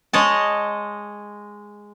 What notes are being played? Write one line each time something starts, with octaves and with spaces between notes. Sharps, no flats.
G#3 C#5 D#5 A5